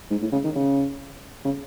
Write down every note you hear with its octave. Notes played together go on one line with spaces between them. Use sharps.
G#2
A2
C#3
D#3
C#3
C#3